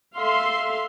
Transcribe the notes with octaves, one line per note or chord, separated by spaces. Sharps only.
A4 E5 F5 C6